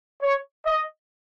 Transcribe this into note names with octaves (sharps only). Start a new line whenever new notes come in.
C#5
D#5